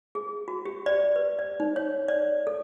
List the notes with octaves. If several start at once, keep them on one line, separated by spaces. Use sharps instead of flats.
G#4
F#4
G4
D5
B4
D5
D#4
C#5
D5
A4